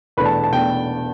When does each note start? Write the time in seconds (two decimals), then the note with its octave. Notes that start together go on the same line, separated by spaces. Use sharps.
0.17 E2 B2 A3 D4 B4
0.25 A5
0.44 A5
0.52 E2 B2 A3 D4 G5